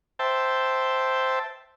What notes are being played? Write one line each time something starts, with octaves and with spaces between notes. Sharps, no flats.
C5 E5 G5 A5